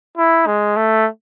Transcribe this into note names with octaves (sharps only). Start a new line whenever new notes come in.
E4
G#3
A3